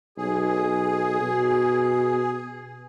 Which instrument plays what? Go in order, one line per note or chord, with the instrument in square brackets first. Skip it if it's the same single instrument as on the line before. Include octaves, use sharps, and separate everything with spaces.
[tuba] B1 [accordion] G#4
[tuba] B2